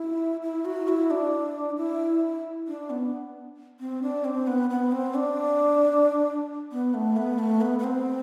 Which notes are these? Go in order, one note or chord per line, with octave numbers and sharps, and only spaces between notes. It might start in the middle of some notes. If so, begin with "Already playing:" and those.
Already playing: E4
E4
F#4
E4
D4
E4
D4
B3
C4
D4
C4
B3
B3
C4
D4
B3
A3
B3
A3
B3
B3
C4